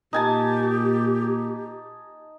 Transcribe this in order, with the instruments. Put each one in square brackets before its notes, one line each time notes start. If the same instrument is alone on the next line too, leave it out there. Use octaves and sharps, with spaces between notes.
[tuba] A#2 [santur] D#4 G#5 A5 [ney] G4